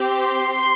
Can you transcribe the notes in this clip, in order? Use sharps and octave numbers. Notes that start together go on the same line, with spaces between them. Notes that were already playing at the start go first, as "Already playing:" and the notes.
Already playing: C4 G4
C6